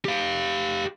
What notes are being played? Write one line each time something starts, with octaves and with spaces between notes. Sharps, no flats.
G4 F5